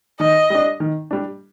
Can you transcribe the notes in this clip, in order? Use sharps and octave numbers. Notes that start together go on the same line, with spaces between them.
D#3 D#5
G3 D4
D#3
G3 D4